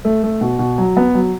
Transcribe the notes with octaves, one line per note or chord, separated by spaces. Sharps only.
A3
A3
B2
B2
F#3
B3
F#3